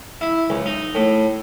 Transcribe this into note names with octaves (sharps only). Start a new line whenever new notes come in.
E4
C#2
D#4
A2